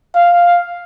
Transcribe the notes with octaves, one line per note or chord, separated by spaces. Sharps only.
F5